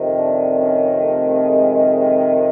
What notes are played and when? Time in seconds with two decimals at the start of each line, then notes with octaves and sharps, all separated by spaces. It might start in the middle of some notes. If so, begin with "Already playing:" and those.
Already playing: F2 C3 D#3
0.17 D4
0.59 C#4
1.01 A3
1.43 G#3
1.85 G#3